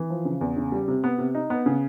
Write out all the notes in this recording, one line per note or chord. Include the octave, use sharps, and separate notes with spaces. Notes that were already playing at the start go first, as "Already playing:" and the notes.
Already playing: E3
F3
C#3
E2
C#3
G3
C3
B3
C3
D#4
B3
C#3